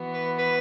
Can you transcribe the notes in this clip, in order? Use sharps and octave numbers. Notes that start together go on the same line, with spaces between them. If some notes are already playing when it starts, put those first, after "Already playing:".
Already playing: E3 B3 F#4
B4
B4